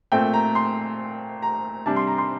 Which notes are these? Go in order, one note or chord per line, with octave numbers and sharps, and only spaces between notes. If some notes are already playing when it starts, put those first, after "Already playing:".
A#2 A3 C4 G5
A#5
C6
A#5
C3 G3 D4 A5
C6
A#5
C6